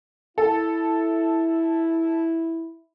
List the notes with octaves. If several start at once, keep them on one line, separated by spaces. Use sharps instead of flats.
E4 A4